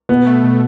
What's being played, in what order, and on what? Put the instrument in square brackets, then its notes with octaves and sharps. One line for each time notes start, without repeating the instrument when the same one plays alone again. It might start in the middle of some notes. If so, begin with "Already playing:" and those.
[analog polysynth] B2 [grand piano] B3
[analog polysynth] A3
B2